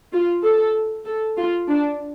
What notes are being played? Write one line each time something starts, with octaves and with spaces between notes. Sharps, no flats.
F4
A4
A4
F4
D4